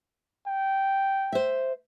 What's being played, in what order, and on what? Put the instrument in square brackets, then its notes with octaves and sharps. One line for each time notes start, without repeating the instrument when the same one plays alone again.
[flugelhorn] G5
[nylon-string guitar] C5 E5